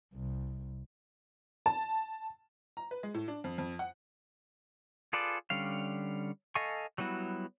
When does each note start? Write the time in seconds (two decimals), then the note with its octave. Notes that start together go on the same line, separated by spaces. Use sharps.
0.14 C2
1.66 A5
2.77 A#5
2.91 B4
3.03 G#3
3.14 A2
3.28 D4
3.44 F2
3.58 F2
3.79 F#5
5.13 F4 G#4 A4 B4 D5
5.50 D3 G3 C#4 F5
6.55 A4 D#5 F5 G#5 C#6
6.98 F#3 G3 B3 E4 F#4